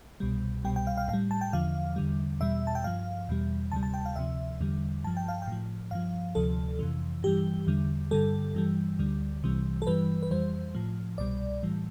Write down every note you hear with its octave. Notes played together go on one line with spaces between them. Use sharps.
C2 B2 G3
C2 B2 G3 G5
G5
F5
F5
A2 F5
G3
A5
G5
E2 D3 F3 F5
E2 D3 G3
E2 B2 G3 E5
A5
G5
G2 F3 F5
E2 B2 G3
D2 C3 G3 A5
A5
G5
F5
D2 C3 F3 E5
E2 D3 G3
G2 F3 A5
G5
F5
G5
A2 F3
G2 F3 F5
D2 C3 F3 A4
F2 C3 E3
G2 E3 G3 G4
E2 D3 G3
G2 D3 G3 A4
G2 E3 G3
D2 D3 G3
C2 C3 E3 G3
A4
G2 E3 G3 B4
B4
F2 E3 G3 C5
A2 F3
C2 B2 G3 D5
A2 E3 G3